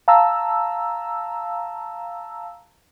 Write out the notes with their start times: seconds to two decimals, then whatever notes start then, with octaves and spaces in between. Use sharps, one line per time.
0.08 F5 A5 A#5 E6